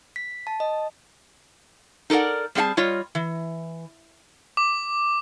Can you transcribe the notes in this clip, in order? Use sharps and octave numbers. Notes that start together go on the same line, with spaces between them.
B6
A5
D#5
D#4 A4 A#4 D5 F#5
G3 C4 G#4 F5 A5
G3 F4 C#5 D#5
E3
D6